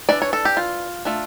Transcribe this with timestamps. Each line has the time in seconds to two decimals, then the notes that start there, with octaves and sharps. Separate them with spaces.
0.09 E3 A3 D4 D5
0.22 C#5
0.33 A4
0.45 G4
0.57 F4
1.05 A3 D4 F4